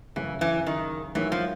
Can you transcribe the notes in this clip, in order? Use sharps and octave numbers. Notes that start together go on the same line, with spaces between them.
G1 F#2 C#3 E3
E3
D#3
G#2 D#3 E3 F#3
F3